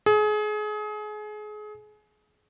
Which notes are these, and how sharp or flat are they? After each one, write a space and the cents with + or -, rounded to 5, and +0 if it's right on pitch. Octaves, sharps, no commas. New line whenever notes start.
G#4 +30